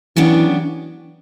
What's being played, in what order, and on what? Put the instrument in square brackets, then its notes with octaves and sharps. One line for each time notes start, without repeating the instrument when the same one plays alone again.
[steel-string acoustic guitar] C#3 F#3 B3 D4 G4 [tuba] E3